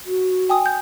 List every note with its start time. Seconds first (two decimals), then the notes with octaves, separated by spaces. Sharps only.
0.06 F#4
0.49 G5 G#5 D#6
0.66 G6